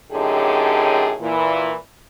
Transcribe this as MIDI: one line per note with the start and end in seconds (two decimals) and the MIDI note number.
0.12 1.14 42
0.12 1.14 45
0.12 1.14 50
0.12 1.14 63
0.12 1.14 67
0.12 1.14 68
1.20 1.74 46
1.20 1.74 52